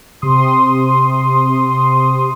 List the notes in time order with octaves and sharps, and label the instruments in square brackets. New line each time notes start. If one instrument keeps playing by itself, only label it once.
[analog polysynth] C3 C6 D#6